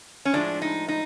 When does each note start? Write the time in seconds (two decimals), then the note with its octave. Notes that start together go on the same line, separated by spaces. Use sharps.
0.25 C#4
0.33 A2 F3 G#3 D4
0.62 D#4
0.88 D#4